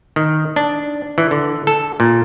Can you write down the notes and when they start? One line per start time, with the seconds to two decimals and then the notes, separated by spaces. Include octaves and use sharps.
0.16 D#3
0.56 D4
1.18 E3
1.31 D3
1.67 A4
2.00 A#2